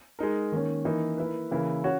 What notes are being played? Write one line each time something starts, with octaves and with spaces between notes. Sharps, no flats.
G#3 D#4 A#4
D#3 A#3 C#4
E3 A#3 D#4
A#3 E4 B4
C#3 E3 A#3 E4
C#4 F#4 C#5